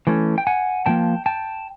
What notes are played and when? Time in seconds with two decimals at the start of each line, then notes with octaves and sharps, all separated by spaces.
0.07 E3 A3 C#4
0.38 G5
0.47 F#5 G#5
0.86 A#2 F3 A#3 G5 A5
1.26 G5 A5